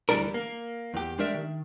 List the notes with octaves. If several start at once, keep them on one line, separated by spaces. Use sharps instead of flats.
D2 E3 G3 D4 A#4
A#3
E2 G4
G#3 D4 G4 A#4 D5 E5
D#3